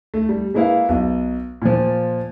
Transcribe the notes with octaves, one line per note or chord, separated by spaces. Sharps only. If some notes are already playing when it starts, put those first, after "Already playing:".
A3
G3
G#3 A#3 E4 B4 F5
B1
A#2 F3